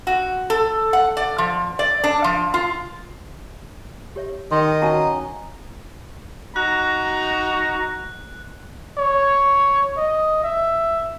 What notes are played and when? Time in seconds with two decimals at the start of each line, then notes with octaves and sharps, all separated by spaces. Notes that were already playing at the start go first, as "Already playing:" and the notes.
0.07 F#4
0.50 A4
0.93 F#5
1.17 D5
1.38 F3
1.79 D5
2.04 D4
2.24 F3
2.54 F4
4.16 G4 C#5 E5
4.51 D#3 D#5 G5 C6
4.82 C#4 F#4 F5 F#5 A5 A#5
6.56 D#4 F#4 A#5 F#6
8.98 C#5
9.97 D#5
10.44 E5